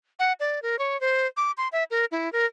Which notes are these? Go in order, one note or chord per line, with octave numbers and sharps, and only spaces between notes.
F#5
D5
A#4
C#5
C5
D6
C6
E5
A#4
E4
A#4